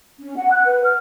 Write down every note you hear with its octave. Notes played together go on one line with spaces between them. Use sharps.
C#4
F#5
F#6
B4
F6